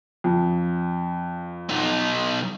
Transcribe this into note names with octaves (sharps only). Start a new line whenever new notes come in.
F2
B1 D#4